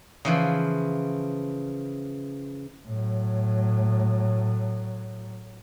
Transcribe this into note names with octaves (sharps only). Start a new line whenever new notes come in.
C#3 E3 F3
A2 F#3